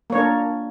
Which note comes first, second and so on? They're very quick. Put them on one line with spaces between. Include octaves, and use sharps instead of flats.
A#3 C#5 D4 A#4